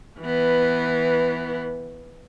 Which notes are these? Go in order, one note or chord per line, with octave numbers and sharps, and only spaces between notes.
E3 B3